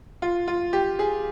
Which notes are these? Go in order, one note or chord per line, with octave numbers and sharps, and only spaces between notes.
F4
F4
G4
G#4